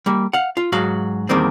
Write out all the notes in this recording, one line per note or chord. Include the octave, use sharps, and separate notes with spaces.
G3 A#3
F5 F#5
F4
G#2 F#3 F#4 F5
E2 D#3 G3 A#3 C4